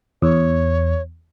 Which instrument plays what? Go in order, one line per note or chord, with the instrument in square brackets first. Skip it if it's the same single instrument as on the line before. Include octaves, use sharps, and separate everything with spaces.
[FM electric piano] E2 [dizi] C#5